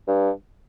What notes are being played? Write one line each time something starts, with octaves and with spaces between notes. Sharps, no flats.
G2